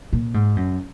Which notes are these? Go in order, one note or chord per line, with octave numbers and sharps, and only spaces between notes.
A#2
G#2
F#2